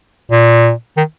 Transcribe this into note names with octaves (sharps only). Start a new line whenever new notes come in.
A#2
D#3